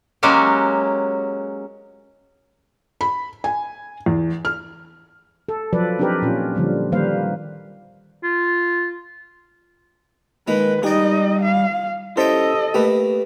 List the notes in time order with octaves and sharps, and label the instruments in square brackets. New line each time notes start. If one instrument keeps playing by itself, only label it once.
[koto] F#3 G#3 A#3 C#4 F#4 G4
[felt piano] B5
G#5
E2
F6
[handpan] A4
F3 F#3 A4 B4 D5
C4 D4 D#4 G4 A#4 B4
A#2 C#4 F4
D3 F3 G3 A#3
D#3 G3 A#3 B4 C5 F5
[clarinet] F4
[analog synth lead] D#3 [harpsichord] G#3 A#3 [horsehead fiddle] B4
[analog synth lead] G3 [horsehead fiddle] D#4 D#5 [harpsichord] G#4 D5
[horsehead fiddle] F5
[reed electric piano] C#4 E4 C5 [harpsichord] G4 E5 G5 [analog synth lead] A4 [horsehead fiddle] D#5
[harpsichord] A3 A#3 [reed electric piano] G4 B4